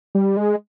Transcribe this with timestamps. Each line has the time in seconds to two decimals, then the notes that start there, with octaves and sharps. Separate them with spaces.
0.15 G3
0.37 G#3